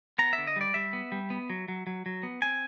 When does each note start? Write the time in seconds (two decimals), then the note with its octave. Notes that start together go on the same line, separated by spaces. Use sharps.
0.18 B3 A#5
0.33 E5
0.38 D3
0.47 D#5
0.56 G3 D5
0.74 G3 E5
0.93 B3
1.12 G3
1.30 B3
1.50 F#3
1.68 F#3
1.87 F#3
2.06 F#3
2.23 B3
2.42 C4 G#5